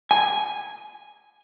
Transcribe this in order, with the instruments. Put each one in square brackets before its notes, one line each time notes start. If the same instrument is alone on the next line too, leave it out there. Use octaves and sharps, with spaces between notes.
[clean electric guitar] G#5